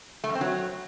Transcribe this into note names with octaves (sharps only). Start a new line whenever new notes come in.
A3
F#2
C4
F#3